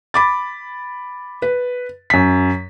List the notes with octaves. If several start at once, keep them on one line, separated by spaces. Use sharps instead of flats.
B5 D6 A6
B4
F#2 B6